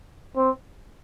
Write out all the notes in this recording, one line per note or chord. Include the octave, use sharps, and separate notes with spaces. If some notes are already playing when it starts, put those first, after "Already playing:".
C4